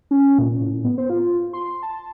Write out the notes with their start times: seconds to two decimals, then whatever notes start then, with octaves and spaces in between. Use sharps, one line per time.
0.11 C#4
0.38 A#2
0.61 A2
0.85 B3
0.98 C5
1.10 F4
1.53 C6
1.83 A5